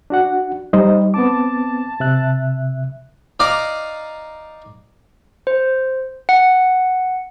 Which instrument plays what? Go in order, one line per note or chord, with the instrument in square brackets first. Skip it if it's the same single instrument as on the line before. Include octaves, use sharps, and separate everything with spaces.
[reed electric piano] D4 F#4 F#5
[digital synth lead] G3 [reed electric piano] D#4 C5 D#5
[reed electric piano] B3 C4 D6 [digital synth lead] A5
[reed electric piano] C3 E5 F#6
[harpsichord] D#4 D5 F5 A#5 D6
[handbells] C5
F#5